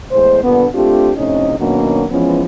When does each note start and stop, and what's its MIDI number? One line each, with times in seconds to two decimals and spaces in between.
0.11 0.41 40
0.11 0.41 45
0.11 0.41 56
0.11 0.41 72
0.43 0.66 43
0.43 0.66 46
0.43 0.66 50
0.43 0.66 59
0.74 1.12 57
0.74 1.12 60
0.74 1.12 62
0.74 1.12 65
0.74 1.12 67
1.17 1.55 41
1.17 1.55 45
1.17 1.55 48
1.17 1.55 61
1.17 1.55 63
1.17 1.55 75
1.59 2.05 47
1.59 2.05 51
1.59 2.05 54
1.59 2.05 58
1.59 2.05 61
1.59 2.05 62
2.11 2.44 52
2.11 2.44 53
2.11 2.44 56
2.11 2.44 59
2.11 2.44 61